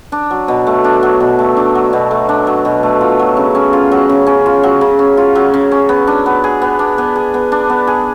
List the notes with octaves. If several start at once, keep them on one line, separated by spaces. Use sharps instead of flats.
D4
F#3
B2
A3
D4
F#3
B2
A3
D4
F#3
B2
A3
D4
F#3
B2
A3
F4
F#3
C#3
C#4
F4
F#3
C#3
C#4
F4
F#3
C#3
C#4
F4
F#3
C#3
C#4
B3
D4
B3
G#4
B3
D4
B3
G#4
B3
D4
B3
G#4